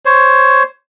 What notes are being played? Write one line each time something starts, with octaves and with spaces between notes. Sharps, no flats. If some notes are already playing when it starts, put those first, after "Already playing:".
C5 C#5